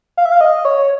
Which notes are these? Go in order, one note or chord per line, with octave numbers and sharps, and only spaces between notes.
F5
E5
F5
D#5
C#5